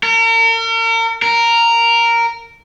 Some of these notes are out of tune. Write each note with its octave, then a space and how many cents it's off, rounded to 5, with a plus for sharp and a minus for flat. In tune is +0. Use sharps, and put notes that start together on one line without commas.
A#4 -40
A#4 -5